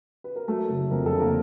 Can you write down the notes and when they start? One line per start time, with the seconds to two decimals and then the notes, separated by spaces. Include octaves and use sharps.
0.24 B4
0.36 A#4
0.48 F#3 A3 A4
0.69 F#1
0.91 F2 A#4
1.06 A4
1.13 D3
1.19 A#3 A#4